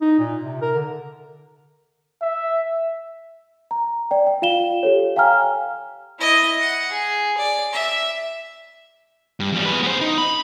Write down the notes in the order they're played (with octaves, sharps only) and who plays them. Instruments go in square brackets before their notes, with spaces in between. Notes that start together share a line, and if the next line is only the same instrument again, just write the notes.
[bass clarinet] D#4
A#2
C3
A#4
D3
[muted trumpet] E5
[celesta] A#5
D5 G5
G5
F4 F5 E7 G7
G4 A4 C#5
F5 G5 G#5 A#5 F6
[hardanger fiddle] E4 D#5
F#5
G#4
D5
E5
[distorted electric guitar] G2
E2 G3
G#4 B4
B3 C5
D#4
B5